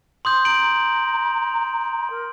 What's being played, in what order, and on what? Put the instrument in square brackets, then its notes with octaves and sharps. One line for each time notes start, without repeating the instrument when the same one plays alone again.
[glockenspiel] C6 D#6 G6
[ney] A#5 [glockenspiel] D7 F#7
[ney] A#4